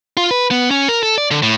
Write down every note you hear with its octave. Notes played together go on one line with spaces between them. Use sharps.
F4
B4
B3
C#4
A#4
A4
D5
D3
A2